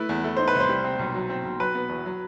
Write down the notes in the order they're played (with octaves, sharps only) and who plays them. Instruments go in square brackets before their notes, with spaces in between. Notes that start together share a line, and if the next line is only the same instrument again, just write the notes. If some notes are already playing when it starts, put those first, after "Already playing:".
Already playing: [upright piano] A3 E4 [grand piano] B4
[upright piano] E2
A3
[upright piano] D#4 [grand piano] C5
[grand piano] B4
[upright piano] C2
[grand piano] C5
[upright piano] G3
C4
B1
F#3
C4
B1
[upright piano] F#3 [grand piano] B4
[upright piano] B3
E2
F#3